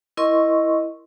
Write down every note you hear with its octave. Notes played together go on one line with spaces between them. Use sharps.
E4 A#4 D#5 C6 C#6